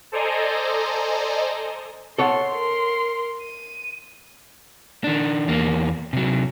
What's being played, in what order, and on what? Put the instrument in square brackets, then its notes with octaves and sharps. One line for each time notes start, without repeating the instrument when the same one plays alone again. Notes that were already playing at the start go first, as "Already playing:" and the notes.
[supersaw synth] A4 C5 D5 D#5 G#5 A#5
[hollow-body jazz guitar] A4 C#5 F#5 [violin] C6
[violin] A#4 C6
D#7
[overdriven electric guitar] D#3 D4
E2 A#3
C3 F#3